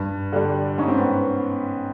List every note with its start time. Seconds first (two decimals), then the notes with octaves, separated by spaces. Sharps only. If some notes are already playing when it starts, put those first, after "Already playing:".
Already playing: G2
0.32 D3 G3
0.78 G#2 C#4
0.88 C4
0.98 B3